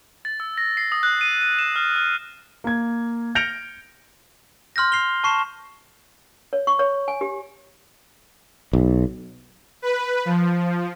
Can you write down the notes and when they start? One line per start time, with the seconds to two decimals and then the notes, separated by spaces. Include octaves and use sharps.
0.25 A6
0.40 E6
0.58 A#6
0.77 C7
0.92 D#6
1.03 F#6
1.21 D#7
1.41 D#7
1.59 E7
1.76 F6
1.96 F6
2.64 A#3 G#6
3.35 F6 G6 A#6 C#7 D7 F7
4.76 C6 F6 G6 A#6
4.92 C7 F7 G7
5.24 A5 C#6 C7 E7
6.53 C#5
6.67 C#6
6.79 C#5
7.08 G#5
7.21 G4
8.73 B1
9.82 B4
10.25 F3